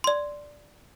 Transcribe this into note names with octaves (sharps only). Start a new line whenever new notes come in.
D5 C6